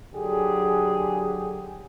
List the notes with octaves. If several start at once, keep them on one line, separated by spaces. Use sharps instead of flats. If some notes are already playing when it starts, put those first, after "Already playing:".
D3 F#3 G4 G#4